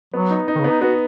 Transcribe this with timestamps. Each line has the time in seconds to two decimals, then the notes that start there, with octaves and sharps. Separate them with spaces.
0.14 F#3 B3
0.31 D#4
0.48 D#4
0.56 D#3
0.60 C#3
0.64 B3
0.70 D#4
0.82 B3 F#4